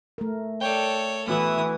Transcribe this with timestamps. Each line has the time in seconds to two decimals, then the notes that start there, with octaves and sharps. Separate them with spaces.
0.18 A3 A#4
0.61 A4 C#5 D5 G5
1.28 E3 A3 B3 E4 F#4 D#6